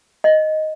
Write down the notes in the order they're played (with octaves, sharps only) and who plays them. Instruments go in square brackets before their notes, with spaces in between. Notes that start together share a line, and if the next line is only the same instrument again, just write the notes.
[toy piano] D#5